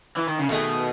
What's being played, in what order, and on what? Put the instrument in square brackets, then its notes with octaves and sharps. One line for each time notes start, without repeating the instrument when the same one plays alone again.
[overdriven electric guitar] E3
D#3
C#3
[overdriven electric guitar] B2 [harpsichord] D#3 A3 D#4 G#4